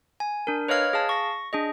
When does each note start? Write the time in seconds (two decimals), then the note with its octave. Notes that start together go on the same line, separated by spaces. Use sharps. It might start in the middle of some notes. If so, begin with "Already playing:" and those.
0.20 G#5
0.47 D4 A#4
0.68 B4 C#5 D#5 F5 F6 G#6
0.93 G#4 F5 A5
1.09 C#6 A#6
1.53 D4 G#4 D#5